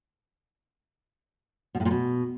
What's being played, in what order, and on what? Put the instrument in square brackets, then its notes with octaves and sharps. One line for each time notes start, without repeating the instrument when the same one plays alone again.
[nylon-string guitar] B2
A2
A#2
B2